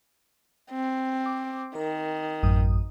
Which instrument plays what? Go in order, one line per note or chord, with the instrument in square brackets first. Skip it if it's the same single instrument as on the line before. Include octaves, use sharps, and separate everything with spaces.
[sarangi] C4
[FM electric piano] D6
[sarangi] D#3 [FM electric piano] A#4
[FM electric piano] A1 F#2 D#6